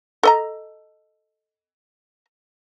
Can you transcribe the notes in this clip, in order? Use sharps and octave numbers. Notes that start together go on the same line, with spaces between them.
A4 D#5 A#5